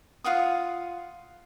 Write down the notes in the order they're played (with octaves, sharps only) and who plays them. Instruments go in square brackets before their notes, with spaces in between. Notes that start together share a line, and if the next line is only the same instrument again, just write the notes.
[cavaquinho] F4 F5 F#5 D#6